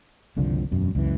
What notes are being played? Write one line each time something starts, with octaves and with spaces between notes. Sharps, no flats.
F#1 C2 D3 F3
E1 F#2
C#2 F#2 E3